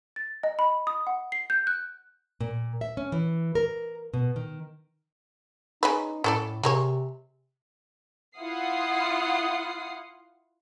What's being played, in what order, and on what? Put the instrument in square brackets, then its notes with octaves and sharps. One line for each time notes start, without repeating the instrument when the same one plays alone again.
[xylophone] A6
D#5
B5
D#6
F#5
C7
G6
F#6
[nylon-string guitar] A#2
E5
C#4
E3
A#4
B2
D#3
[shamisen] G#3 C#4 B4 [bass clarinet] D#4
[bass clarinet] A2 [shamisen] C#4 A4 D5
[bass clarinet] C3 [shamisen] G#3 A#3 C#5
[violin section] E4 F4 F5 F#5 D#6 C7